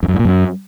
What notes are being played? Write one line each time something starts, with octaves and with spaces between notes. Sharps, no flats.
F2
F#2
G2
A#2
F#2